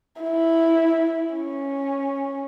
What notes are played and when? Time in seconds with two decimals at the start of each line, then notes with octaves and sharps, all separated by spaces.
0.21 E4
1.35 C#4